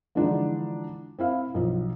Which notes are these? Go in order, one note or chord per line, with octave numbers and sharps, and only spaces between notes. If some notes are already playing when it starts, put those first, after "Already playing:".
D3 E3 F3 G#3 D4 D#4
C4 E4 F5
B1 F3